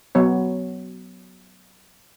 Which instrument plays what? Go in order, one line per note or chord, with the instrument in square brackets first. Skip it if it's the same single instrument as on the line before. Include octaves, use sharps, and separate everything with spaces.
[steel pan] F#3 B3 C#5